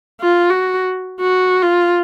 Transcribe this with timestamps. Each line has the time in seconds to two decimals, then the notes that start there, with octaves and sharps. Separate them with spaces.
0.21 F4
0.50 F#4
1.20 F#4
1.63 F4